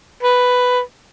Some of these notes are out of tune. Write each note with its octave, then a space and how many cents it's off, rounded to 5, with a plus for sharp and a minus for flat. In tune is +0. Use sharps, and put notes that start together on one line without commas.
B4 +5